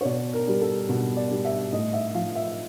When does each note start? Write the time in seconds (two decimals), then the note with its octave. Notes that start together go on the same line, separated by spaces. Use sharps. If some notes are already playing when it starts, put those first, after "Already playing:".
0.01 C#5
0.05 B2 D5
0.33 A#4
0.48 G3
0.61 A4
0.89 B2
1.17 D5
1.31 G3
1.45 E5
1.72 A2 D#5
1.93 E5
2.14 F3 F5
2.35 E5